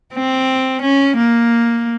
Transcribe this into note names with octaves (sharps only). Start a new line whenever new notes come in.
C4
C#4
A#3